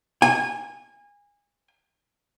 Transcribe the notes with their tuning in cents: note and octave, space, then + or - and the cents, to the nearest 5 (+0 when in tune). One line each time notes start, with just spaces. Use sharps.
G#5 -25